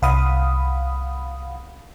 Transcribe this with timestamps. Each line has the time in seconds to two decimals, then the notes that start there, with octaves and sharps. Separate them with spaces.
0.02 C2 F5 F#5 B5 D#6